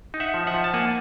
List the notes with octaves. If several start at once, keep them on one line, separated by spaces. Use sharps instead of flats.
D#4
E5 F#5
F3
E5 F#5
F3
A5
A#3 F#5 G#5